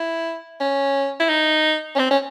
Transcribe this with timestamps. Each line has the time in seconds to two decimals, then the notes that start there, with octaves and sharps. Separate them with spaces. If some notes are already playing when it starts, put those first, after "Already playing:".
Already playing: E4
0.61 C#4
1.20 E4
1.30 D#4
1.95 C#4
1.99 C4
2.11 C#4